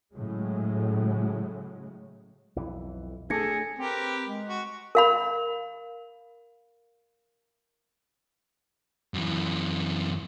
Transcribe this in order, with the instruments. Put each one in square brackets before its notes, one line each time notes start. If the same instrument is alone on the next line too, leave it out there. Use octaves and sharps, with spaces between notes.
[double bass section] A2 C#3 F#3 G#3
[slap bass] B1 F2 E3
[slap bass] A3 D4 [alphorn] G#4 [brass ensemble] A4 [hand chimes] G#6 A#6 C#7
[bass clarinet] C4 [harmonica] G4 A#4 B4
[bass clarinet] G#3
[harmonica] F#4
[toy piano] A#4 F5 B5
[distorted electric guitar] F#2 E3